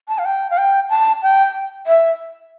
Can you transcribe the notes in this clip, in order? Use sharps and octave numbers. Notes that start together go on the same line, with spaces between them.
A5
F5
G5
F5
G5
A5
G5
E5